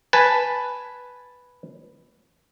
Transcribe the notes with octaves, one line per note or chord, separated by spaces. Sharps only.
B4 G#5 A5